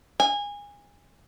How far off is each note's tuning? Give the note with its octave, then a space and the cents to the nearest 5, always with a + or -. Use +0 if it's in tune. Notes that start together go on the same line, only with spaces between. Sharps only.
G#5 -25